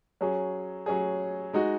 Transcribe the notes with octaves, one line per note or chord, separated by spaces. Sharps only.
F#3 C#4 G#4
F#3 C#4 G#4
G#3 D#4 F#4